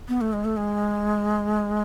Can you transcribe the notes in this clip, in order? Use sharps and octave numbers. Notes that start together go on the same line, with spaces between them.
B3
A3
G#3
A3
G#3